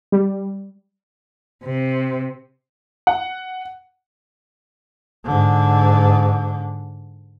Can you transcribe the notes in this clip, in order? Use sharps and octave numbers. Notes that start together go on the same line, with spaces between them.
G3
C3
F#5
G#2 D3